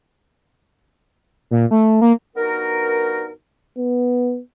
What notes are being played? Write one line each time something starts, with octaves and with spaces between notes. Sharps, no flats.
A#2
A3
A#3
G2 B3 D#4 F#4 A#4
B3